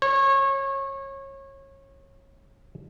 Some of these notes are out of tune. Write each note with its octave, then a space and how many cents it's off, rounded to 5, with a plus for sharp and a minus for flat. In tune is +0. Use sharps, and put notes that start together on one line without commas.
C#5 -25